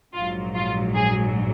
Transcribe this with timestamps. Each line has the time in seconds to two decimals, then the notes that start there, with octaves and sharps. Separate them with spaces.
0.14 A#1 G#2 F#3 F4
0.55 F4
0.96 G#4